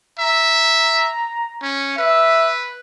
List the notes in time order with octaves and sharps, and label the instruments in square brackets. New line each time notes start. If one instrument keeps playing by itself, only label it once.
[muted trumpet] E5 [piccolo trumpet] A#5
[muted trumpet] C#4
[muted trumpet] B4 [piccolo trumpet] E5